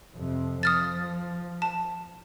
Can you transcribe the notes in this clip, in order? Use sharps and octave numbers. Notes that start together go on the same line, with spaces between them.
F2 C3
F3 D#6 F6 A6
A5